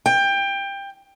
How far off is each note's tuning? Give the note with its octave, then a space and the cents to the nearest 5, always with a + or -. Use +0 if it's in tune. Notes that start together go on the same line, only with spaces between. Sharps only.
G5 +20